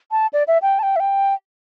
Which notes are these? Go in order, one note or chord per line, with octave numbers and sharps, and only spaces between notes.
A5
D5
E5
G5
A5
G5
E5
G5